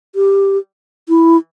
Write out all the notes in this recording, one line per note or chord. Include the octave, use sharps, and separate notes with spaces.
G4
E4